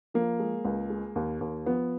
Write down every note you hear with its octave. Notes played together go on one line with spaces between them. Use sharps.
F3 A#3
G#3
C#2
G#3
D#2
D#2
F3 B3